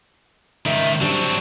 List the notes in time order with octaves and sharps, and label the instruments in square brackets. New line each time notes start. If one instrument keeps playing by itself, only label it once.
[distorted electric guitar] C#2 D#3 [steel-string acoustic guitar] D#5 E5
[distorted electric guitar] F#3 C4 [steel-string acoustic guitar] G3 D4